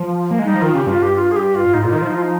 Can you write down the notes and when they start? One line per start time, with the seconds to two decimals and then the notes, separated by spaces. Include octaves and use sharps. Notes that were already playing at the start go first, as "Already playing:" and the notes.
Already playing: F3
0.31 A#3
0.39 G#3
0.44 G3 D#4
0.54 F3
0.62 D#3 F4
0.74 C#3 G4
0.87 G2 F4
1.02 G4
1.16 F4
1.31 G#4
1.36 G4
1.55 F4
1.74 G#2 D#4
1.83 A#2 F4
1.90 D#3 D#4
1.98 F4
2.02 F3
2.07 D#4
2.12 F3 F4
2.22 D#4